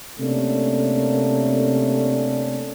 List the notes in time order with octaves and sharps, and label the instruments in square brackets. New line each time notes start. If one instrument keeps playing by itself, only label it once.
[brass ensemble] C3 A3 A#3 C#4 D4